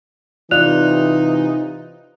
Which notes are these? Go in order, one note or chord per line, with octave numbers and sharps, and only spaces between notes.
C3 E3 D#4 F4 D5 F#6 F7